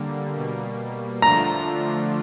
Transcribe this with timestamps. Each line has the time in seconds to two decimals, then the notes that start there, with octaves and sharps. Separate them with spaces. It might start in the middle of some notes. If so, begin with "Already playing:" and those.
Already playing: D3 G3 A#3
0.35 B2 G3 A#3
1.22 D3 F3 A3 D4 F4 A#5